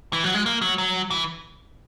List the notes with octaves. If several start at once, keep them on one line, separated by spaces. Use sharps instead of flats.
E3
F#3
G#3
A#3
F#3
F#3
E3